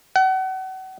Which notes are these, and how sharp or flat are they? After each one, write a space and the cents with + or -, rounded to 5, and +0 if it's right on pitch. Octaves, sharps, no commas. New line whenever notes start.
F#5 +35